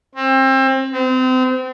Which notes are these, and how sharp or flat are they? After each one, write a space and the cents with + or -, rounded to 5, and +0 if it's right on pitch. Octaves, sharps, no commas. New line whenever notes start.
C4 +30
C4 -30